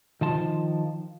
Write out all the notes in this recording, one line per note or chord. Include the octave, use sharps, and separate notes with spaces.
D#3 F3 A5 C6